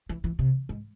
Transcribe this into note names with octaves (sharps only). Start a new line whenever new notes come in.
E3
E3
C3
G#2